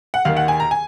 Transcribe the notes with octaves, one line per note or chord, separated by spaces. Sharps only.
F#5
D#2 D#3 F5
F#5
G#5
A#5
G#5